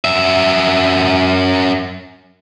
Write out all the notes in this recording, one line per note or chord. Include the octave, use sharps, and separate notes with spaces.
F#2 E5